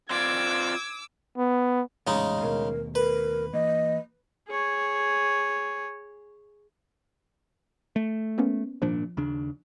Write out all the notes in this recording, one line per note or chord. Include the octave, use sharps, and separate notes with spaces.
C4 F4 D5 D6 E6 G#6
B3
A1 F2 A#2 C#3 G#3 D#4
D#2 B2 A3 A#4
A#4 B4
E3 A#3 D#5
G#4 C#5
A3
A#3 B3 C#4
G#1 A#2 F3 D4
D#2 C#3 D4